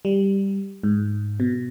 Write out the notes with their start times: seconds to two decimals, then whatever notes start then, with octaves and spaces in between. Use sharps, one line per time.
0.05 G3
0.83 G#2
1.40 B2